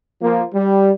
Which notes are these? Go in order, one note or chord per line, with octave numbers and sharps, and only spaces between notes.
F3 A#3
G3